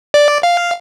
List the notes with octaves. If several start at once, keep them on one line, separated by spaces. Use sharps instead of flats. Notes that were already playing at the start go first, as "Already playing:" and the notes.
D5
F5